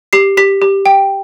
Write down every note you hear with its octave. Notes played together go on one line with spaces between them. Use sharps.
G4 C7
G4 B6
G4
G5